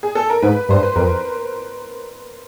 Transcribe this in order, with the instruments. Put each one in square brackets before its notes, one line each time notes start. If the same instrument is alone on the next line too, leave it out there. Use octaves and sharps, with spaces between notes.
[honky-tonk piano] G#4
A4
A#4
[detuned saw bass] G#2 [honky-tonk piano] B4
[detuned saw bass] G2 [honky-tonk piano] C5
[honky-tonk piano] B4
[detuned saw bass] F2 [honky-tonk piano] A#4